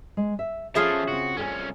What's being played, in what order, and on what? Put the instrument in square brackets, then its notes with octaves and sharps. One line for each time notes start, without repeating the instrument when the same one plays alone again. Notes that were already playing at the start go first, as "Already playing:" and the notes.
[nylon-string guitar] G#3
E5
[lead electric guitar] F3 A4 [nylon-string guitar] C#4 [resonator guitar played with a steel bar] F4 G#4 E5
[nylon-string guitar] C#3 C4 [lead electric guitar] F#4
[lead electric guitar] C2 C#4 [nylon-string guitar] A4 G5 G#5